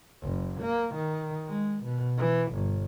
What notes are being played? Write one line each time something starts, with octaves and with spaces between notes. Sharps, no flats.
F#1
A#3
D#3
G#3
B2
E3
G1